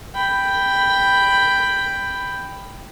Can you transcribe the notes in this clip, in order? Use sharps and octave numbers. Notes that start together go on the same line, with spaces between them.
G5 B5